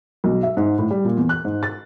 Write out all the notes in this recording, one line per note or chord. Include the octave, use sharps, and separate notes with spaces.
B1
E5
G#2
A2
G3
A#2
E2
F#6
G#2
A6